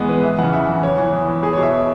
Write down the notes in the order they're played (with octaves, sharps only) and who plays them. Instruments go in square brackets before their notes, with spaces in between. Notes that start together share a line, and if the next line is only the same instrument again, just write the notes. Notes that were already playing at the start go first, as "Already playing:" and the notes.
Already playing: [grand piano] E2 G#3 B3
E3 B4
E2 E5
E3 F#5
C#3
E2 E5
C#3 E3
E2 C#5
E3
E2
E3
E2 G#4
C#5
B2
E5